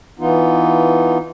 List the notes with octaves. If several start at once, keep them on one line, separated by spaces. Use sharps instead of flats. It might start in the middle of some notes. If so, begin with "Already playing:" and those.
E3 B3 D#4 F4